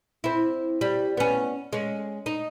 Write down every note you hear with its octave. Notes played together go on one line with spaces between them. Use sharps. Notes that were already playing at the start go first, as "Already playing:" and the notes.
C4 E4
G3
B3 C#4
G#3 C#4
D#4